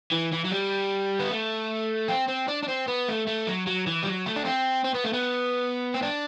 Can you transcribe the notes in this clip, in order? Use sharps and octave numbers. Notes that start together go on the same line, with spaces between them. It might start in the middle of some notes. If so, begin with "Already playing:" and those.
E3
E3
F#3
G3
B3
A3
C4
C4
D4
D4
C4
B3
A3
A3
F#3
F#3
E3
G3
F#3
A3
D4
C4
C4
B3
A3
B3
C4
D4